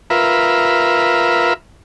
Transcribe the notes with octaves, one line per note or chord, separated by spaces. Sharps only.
F4 A#4 B4 E5